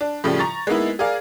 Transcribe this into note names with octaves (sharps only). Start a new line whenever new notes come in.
D4
A2 C#3 F3 G3
A#5 C#6 A6
G#3 A#3 B3 D#4 E4
G#4 A#4 D5 F5